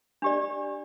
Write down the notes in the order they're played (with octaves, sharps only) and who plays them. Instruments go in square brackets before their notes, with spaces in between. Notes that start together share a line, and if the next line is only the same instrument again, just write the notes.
[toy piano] D4 G4 D5